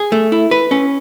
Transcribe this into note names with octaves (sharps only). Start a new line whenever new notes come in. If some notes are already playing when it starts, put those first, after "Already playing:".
Already playing: G#4
A3
E4
B4
C#4